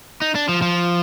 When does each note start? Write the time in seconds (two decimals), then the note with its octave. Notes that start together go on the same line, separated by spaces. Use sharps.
0.22 D#4
0.35 D4
0.49 F3
0.62 F3